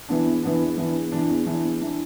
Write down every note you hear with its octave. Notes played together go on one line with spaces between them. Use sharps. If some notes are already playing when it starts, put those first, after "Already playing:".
E3 B3 D4
E2
E3 B3 D4
E2
E3 B3 D4
E2
E3 D4
E2
E3 D4
E2
E3 D4